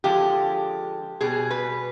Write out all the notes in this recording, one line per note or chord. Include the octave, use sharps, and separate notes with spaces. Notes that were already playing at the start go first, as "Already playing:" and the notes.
D3 F3 G#3 G4
B2 G3 G#4
B4